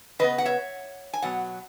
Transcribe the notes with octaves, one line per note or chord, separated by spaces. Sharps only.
C#3 G#3 B3 B4 D#5
F#5
C#5 E5
G#5
B2 F#3 B3 F#5